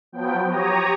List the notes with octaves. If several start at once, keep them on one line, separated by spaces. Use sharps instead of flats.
F3 F#3 B3 G5
G4 C#5 A#5 D#6